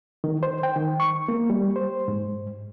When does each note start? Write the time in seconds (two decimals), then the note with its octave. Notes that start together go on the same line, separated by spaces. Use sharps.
0.24 D#3
0.43 C5
0.63 G5
0.76 D#3
1.00 C#6
1.29 A#3
1.50 G3
1.76 C5
2.08 G#2